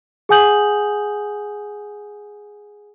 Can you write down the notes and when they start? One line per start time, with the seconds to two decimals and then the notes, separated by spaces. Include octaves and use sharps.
0.29 G#4 F#5 G#5 D#6 G6 F#7